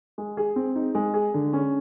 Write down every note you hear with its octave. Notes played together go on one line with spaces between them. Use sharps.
G#3
G#4
C4
D#4
G#3
G#4
D3
C#4